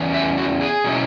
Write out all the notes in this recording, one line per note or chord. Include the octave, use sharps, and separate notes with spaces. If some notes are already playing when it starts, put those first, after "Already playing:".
Already playing: E2 E3 C#4
E5
F#4
G#4
B2 F#3 C#4 E4